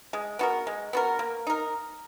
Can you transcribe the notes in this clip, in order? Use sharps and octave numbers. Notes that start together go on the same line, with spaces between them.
G#3
B3 F#4 A#4
G#3
B3 F#4 A#4
A#3
D#4 A#4